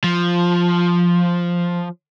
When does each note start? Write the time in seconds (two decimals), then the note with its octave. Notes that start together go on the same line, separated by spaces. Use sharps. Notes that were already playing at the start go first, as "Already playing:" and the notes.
0.04 F3